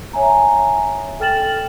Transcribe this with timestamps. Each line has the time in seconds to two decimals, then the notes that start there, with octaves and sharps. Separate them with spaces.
0.13 C#5 E5 G#5 A#5
1.20 A4 G5 F6 A6 E7 F#7